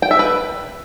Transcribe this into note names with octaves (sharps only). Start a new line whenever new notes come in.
G5
E5
B4